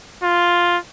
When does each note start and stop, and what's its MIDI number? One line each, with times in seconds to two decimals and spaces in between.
0.23 0.78 65